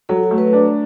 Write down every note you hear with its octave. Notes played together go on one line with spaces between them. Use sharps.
F#3 A4
F#4
A3
B4
D4